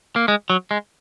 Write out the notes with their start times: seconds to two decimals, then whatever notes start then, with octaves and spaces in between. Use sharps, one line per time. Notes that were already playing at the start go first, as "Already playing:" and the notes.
0.16 A#3
0.28 G#3
0.50 F#3
0.71 G#3